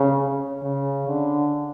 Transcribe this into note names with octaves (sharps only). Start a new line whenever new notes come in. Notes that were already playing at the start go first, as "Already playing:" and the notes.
Already playing: C#3
C#3
D3